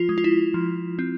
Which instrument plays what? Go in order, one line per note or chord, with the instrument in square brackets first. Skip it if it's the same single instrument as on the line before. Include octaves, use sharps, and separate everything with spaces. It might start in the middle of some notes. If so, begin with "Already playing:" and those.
Already playing: [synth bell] F3 F4
G#3
F4
E4
F3
C4